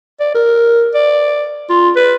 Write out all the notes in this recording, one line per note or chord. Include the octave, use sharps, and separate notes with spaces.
D5
A#4
D5
F4
B4